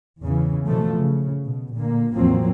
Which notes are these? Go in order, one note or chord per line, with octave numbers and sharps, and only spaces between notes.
E2 C#3 E3
B2 E3 F3 A3
C#3
B2
A#2 D3 A#3
E2 A2 F3 F#3 A#3 C4